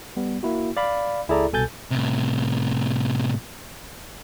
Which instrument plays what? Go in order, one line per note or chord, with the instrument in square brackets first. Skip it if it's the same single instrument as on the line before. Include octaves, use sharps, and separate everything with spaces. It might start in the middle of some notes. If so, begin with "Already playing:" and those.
[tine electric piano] G3 B3
A#3 E4 F#4
D5 F5 B5
C#2 E4 G#4 A4 D5 A#5
C2 B2 A4 G#5 G6 A6
[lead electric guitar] A2 C3